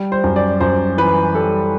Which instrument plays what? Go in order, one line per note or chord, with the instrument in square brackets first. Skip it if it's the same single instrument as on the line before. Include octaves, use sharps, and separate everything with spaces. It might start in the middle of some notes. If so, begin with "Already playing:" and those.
Already playing: [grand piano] G3
C5
F#2
D5
F#2 C5
E3 B4
G3 A4